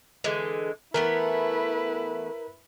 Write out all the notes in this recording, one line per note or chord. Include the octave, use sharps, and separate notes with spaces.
D3 E3 G#3
E3 A3 B3 E4 A#4 B4